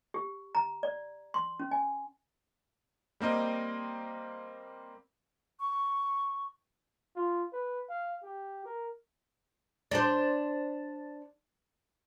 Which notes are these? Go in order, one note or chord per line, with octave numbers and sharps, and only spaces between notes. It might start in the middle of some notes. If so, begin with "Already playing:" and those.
G4
A#5
D5
C6
C#4
G#5
G3 A#3 C4 D#5
C#6
F4
B4
F5
G4
A#4
D4 C5